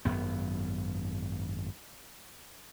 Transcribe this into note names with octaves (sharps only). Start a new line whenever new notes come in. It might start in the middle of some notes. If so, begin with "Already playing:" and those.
G#1 F#2 B3